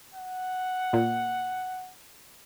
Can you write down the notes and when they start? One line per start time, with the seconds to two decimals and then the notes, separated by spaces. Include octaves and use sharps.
0.14 F#5
0.93 A#2